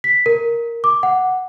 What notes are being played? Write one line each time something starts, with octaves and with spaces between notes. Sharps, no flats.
B6
A#4
D6
F#5